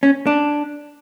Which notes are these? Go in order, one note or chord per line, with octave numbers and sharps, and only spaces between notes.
C#4
D4